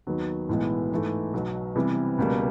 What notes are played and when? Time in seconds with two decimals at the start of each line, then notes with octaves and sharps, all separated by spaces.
0.07 D#2 D#3 F#3 B3
0.49 B1 A2 E3 G#3 B3
0.92 G#2 E3 A3
1.34 B1 B2 F#3
1.76 C3 E3 G3 B3
2.18 C#2 B2 G3 A#3